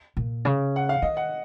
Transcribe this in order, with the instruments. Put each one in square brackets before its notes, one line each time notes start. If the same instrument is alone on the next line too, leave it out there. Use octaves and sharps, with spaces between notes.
[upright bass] A#2
C#3
[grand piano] F#5
F5
[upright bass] D#3 [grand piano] D#5
[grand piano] F#5